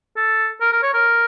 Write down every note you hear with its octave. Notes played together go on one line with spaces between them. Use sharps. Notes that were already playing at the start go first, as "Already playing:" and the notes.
A4
A#4
A#4
C#5
A#4